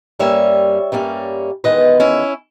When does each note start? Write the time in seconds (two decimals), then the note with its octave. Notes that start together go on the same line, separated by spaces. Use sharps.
0.19 G2 G3 A#3 C#4 C#5 E5
0.92 G2 G3 A#3 C#4
1.64 E2 D#3 G#3 B3 B4 D#5
2.00 C#4 E4